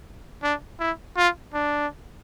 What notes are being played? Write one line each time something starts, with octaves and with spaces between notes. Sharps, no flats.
D4
E4
F4
D4